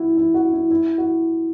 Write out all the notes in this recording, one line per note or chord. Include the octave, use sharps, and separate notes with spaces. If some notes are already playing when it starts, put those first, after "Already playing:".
Already playing: E4 F#4
E4
F#4
E4
E4
F#4